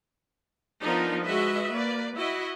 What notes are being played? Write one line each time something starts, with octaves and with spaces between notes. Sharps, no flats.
F3 B3 D4 D#4 A#4
G#3 F#4 B4 D#5 E5
A#3 B4 D5
E4 F#4 D#5 E5